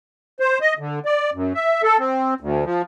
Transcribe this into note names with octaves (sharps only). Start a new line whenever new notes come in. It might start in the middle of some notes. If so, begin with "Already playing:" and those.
C5
D#5
D3
D5
F#2
E5
A4
C4
D2
F3